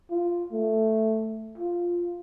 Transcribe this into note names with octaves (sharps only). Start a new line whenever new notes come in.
F4
A3
F4